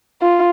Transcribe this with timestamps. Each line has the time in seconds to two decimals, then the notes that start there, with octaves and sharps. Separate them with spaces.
0.22 F4